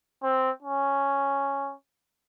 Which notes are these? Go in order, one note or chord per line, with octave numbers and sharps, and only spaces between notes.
C4
C#4